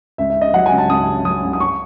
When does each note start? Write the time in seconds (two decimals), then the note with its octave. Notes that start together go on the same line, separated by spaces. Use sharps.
0.18 C#2 E5
0.30 E5
0.36 C#3
0.41 D#5
0.54 F#3 F#5
0.66 G#5
0.72 C#2
0.78 A5
0.89 C#2 D#6
1.08 C#3
1.25 F#3 D#6
1.43 C#2
1.53 D#6
1.60 C#6